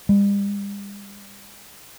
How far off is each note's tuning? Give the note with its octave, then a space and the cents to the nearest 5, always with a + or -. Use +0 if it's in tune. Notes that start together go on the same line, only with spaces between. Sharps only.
G3 +45